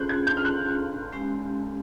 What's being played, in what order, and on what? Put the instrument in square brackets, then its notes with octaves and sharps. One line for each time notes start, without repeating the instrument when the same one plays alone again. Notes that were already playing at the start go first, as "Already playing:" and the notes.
Already playing: [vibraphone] C#4 F4 G#4 C5 [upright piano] F#6 G6
[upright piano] G#6
G6
F6
F#6
[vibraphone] G#3 C#4 E4 G4